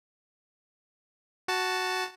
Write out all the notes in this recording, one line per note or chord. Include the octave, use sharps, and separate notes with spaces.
F#4 A5